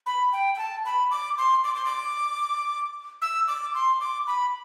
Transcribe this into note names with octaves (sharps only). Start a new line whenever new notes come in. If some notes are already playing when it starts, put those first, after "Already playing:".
B5
G5
G5
A5
B5
D6
C6
D6
C6
D6
E6
D6
C6
D6
B5